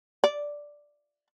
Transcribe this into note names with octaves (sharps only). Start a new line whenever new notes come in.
D5